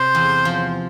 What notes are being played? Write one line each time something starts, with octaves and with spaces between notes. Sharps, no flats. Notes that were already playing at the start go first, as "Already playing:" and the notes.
Already playing: C3 C5
E2
F3